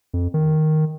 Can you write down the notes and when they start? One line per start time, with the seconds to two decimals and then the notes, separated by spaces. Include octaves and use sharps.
0.14 F2
0.34 D#3